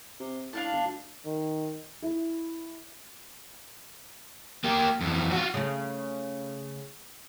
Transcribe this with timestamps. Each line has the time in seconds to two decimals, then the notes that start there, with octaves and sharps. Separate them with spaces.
0.20 C3
0.53 A2 D4 F5 A5
0.72 G1
0.84 D2
1.25 D#3
2.02 E4
4.64 A#3 G4
5.01 F2 E3
5.31 F4 F#4
5.54 C#3 A3